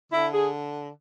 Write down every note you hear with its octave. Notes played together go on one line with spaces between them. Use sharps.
D3 E4
G#4